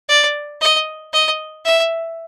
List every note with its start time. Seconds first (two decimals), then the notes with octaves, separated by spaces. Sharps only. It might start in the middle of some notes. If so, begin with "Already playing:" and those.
0.09 D5
0.61 D#5
1.13 D#5
1.65 E5